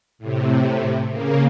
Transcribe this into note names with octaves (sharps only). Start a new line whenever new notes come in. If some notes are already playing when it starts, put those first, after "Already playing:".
A2 C3
C#3 A#3